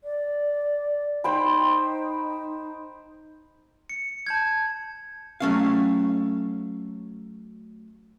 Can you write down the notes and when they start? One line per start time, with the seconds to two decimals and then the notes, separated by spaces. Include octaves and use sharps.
0.04 D5
1.24 D#4 C5 G5 B5
3.90 C#7
4.27 A5 G6 G#6
5.40 F#3 A3 C#4 F5